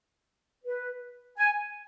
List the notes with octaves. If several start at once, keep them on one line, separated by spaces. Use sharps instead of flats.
B4
G#5